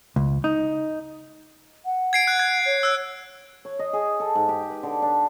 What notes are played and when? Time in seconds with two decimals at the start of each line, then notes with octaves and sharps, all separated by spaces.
0.16 C#2
0.44 D#4
1.85 F#5
2.13 G#6 C7 D7
2.27 F#6
2.40 G#6
2.66 C#5
2.83 E6 F#6
3.65 C#5
3.79 D#5
3.93 G#4
4.20 A4
4.35 G#2
4.49 G4
4.70 B4
4.83 D3
5.02 D4